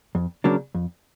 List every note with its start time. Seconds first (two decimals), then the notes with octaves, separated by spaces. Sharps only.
0.15 F2
0.44 C#3 F#3 A#3 D4
0.74 F2